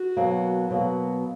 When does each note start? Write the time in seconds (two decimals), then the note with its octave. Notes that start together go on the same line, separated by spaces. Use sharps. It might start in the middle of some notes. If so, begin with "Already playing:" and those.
Already playing: F#4
0.17 B2 F#3 A#3
0.70 B2 F#3 A#3